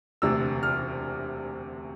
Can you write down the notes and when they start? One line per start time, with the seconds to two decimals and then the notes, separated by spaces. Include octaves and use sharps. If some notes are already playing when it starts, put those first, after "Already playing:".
0.22 E1 D2 C3 E6
0.63 F6